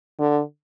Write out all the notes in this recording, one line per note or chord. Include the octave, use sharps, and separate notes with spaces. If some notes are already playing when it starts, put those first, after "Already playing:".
D3